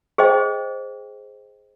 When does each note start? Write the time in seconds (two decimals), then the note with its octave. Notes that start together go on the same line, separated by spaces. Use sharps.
0.18 G#4 C5 D#5 G5